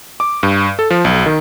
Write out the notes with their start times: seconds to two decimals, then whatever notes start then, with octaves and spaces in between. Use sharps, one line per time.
0.20 D6
0.43 G2
0.79 A4
0.90 F3
1.05 B1
1.26 D#3